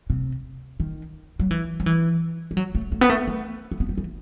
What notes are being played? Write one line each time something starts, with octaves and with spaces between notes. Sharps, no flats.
C3
D#3
F#3
E3
F#3
E3
G3
F#3
A3
A3
B3
A3
A3
C4
B3
G3
E3